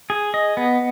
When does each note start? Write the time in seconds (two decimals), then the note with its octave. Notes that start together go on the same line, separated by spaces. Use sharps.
0.10 G#4
0.34 D#5
0.57 B3